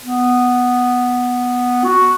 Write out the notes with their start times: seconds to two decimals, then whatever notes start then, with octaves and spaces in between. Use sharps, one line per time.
0.05 B3
1.84 F#4